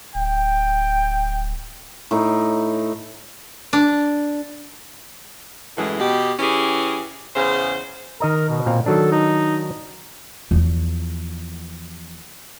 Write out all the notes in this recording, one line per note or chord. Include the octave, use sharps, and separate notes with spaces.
D1 G5
A2 D#4
D4
F#2 A2 E3 G#3
B2 G4
E3 C#4 G4 G#4
E2 C#3 C5
D#3 A#4 D#5 A#5
B2
A#2 C4 F5
D#3 F#3 D4 A4
D#4
E2 F3